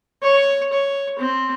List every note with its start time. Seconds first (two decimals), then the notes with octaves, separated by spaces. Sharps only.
0.23 C#5
0.73 C#5
1.19 C4